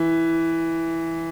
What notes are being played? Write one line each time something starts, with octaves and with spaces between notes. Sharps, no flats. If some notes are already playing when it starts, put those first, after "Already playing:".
Already playing: E3